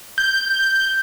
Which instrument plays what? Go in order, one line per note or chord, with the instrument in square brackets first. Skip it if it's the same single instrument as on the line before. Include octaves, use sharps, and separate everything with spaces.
[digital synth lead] G6